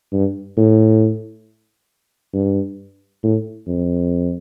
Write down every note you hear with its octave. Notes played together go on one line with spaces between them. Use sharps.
G2
A2
G2
A2
F2